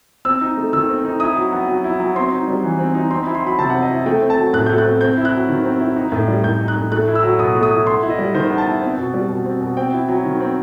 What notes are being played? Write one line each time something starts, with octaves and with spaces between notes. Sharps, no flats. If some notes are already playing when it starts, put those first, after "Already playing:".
C4 E6
D#4
A3
D#3 E6
C4
D#4
E4 D#6
F#3
B3
F#3
E4
F#3
C4 C6
D#4
G3
E3
C4
D#4
C4 C6
B5
E4
C6
F#3 B5
C3 A5
F#5
C4
D#5
E4
A3 G5
C4
A5
F#3
A2 F#6
A3 G6
F#6
C4
C4 G6
E4
F#6
F#3
D#3
C4
E4
D#4
A2
G3
A2 G6
D#4
F#6
A2
A3 F#6
E4
E6
F#3
B2 D#6
A3
D#6
E4
B3 C6
E4
D#5
G3
D#3 C5
B3
A5
E4
C4
B2
G3
B2
C4
B2
C4 G5
E4
F#3
D#3
C4